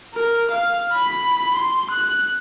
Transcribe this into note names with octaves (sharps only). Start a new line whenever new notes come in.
A#4
F5
B5
C6
F#6